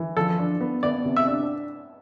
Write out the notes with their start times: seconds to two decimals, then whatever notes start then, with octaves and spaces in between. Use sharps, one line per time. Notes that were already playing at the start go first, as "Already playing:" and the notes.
Already playing: E3
0.17 F3 A4
0.38 D4
0.61 B3
0.83 B3 D5
1.05 C3
1.16 E5
1.27 D4